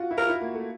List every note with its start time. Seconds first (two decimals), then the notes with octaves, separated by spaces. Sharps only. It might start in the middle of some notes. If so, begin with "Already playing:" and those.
Already playing: F4 F#4
0.11 E4
0.17 F4 A#4
0.29 E4
0.41 A#3
0.55 A3